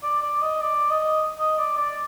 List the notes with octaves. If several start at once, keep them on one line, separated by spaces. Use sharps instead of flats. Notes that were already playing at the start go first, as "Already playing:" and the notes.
D5
D5
D#5
D5
D#5
D#5
D5
D5